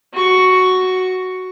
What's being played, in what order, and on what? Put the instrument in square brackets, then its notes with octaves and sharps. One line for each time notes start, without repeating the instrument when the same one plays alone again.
[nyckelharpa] F#4 C#6